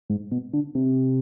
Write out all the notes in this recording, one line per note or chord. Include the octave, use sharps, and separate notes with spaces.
G#2
B2
D3
C3